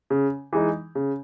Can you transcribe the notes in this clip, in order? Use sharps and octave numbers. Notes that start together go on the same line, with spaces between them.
C#3
E3 G#3 D#4
C#3